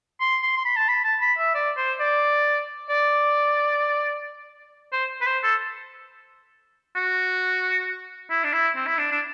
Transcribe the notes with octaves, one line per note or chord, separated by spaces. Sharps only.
C6
C6
C6
B5
A5
B5
A5
B5
E5
D5
C5
D5
D5
C5
B4
C5
A4
F#4
E4
D4
E4
C4
E4
D4
D4